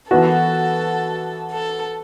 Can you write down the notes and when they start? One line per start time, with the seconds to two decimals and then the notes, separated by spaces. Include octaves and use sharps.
0.11 E3 B3 F#4 A4
1.50 A4